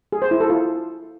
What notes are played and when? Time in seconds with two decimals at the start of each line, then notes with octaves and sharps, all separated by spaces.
0.12 G#4
0.22 C5
0.31 E4
0.40 A4
0.50 F4